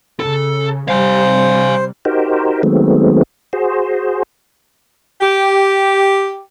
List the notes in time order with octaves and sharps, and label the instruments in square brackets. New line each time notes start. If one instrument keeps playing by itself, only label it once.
[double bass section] C#3 [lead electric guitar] A4
[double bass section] C3 G3 [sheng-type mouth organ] C5 [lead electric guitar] F5 G#5
[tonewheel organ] D#4 F#4 G4 A#4 C5
D#3 F#3 G#3 A3 B3 C4
F#4 G#4 C5
[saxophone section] G4